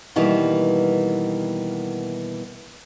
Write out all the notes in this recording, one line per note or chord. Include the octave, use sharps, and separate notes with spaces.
B2 D#3 E3 G3 A#3